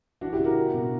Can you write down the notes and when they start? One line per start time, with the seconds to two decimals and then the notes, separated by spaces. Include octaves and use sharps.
0.21 E3 D4 F#4
0.33 E4 G4
0.39 C#3
0.44 F#4 A#4
0.57 A#3
0.74 B2